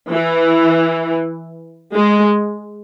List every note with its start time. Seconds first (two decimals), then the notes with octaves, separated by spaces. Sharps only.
0.11 E3
1.96 G#3